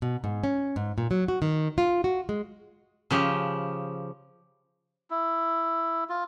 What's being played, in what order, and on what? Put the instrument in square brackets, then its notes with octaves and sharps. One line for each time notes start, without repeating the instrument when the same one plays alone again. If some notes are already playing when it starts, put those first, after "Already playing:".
[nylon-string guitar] B2
G#2
C#4
G#2
A#2
F#3
F#4
D#3
F4
F#4
G#3
[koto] C#3 F3 G4
[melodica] E4
F4